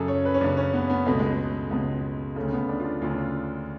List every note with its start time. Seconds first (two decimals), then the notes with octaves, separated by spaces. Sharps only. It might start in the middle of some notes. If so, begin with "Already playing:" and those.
Already playing: F#2 C#3 G#4 A4
0.08 C#5
0.25 B4
0.34 C#4
0.41 F#2 C#3 D4
0.57 C#4
0.74 B3
0.90 B3
1.06 C#2 B2 A3
1.19 G#3
1.33 A3
1.71 C#2 B2
2.36 D2 C#3 A3
2.53 B3
2.69 D4
2.80 F4
2.85 D4
3.02 D2 C#3 F4
3.10 D4
3.18 F4